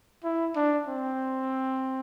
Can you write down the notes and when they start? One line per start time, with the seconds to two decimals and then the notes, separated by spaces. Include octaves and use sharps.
0.24 E4
0.56 D4
0.87 C4